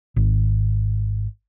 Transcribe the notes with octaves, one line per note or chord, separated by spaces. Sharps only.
G#1